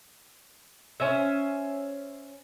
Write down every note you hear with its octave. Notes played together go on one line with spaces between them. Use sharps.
C#4 C5 E5